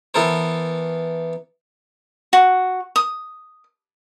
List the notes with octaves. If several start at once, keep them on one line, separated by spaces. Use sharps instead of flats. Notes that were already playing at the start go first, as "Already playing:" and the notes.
E3 B3 A4 A#4 C5
F#4
D#6